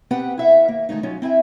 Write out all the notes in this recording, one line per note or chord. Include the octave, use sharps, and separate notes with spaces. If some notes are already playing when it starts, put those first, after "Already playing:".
B3 C4 G4 B4 F#5 G5
E4 E5 F#5
D#2 A#3
D#3 F#3 G#3 A3 D#4
F#3 C#4 D#4 F4
C4 E4 E5 G#5